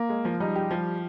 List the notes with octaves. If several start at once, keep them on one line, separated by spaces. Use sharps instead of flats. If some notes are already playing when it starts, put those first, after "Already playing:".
Already playing: A#3
G#3
F3
G3 D#4
G4
F3